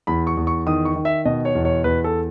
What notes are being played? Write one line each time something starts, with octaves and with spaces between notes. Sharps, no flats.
E2 B5
C#6
E2
C#6
D#3 D#6
C#6
D#3
E5
B2 D#5
C#5
E2
C#5
E2 B4
A4